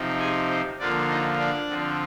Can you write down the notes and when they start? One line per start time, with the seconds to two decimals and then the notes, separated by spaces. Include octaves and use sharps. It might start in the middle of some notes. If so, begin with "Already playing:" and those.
Already playing: C3 F3 C4 D#4
0.20 G#4 G#5
0.50 C5
0.79 D3 F3 A#3 D4 F4 D5
1.09 D#4 D#5
1.39 D4 D5
1.68 D3 F3 C4 F4